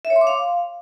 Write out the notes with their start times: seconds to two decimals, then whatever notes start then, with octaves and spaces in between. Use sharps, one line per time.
0.05 E5
0.10 C#5
0.16 C6
0.21 D6
0.27 F5